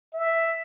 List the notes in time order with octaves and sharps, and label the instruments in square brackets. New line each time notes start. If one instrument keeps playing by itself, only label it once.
[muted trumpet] E5